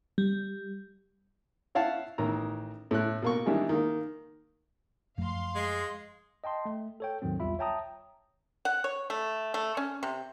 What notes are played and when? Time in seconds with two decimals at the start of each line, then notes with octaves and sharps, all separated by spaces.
0.18 G3
1.75 E4 C#5 F5 F#5 A5
2.18 A1 D#3 A#5
2.91 A2 F#6
3.22 B2 A#3 C#6
3.46 D#3 E3 G3 G#3 D4
3.69 D#3 A#3
5.18 F#2 F3 A3 F5 C6
5.55 G#3
6.44 D#5 G5 A5 C6
6.65 A3
7.00 A4 C#5 G5
7.22 D#2 G#2 D#3 F#3 C4
7.40 B1 E2 G3 F4 E5 B5
7.59 C#5 E5 G5 A5 A#5 D#6
8.65 F#5
8.84 C#5
9.10 A3
9.54 A3
9.77 C#4
10.03 C3